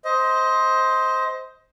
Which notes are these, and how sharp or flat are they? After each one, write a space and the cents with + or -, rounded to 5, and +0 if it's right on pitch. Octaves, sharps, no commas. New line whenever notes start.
C5 +0 D#5 +25